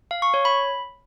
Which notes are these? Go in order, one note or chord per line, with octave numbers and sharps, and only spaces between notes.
F5
C#6
C#5
B5